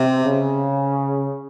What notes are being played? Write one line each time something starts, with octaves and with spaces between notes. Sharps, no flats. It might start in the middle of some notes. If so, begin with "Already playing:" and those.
Already playing: C3
C#3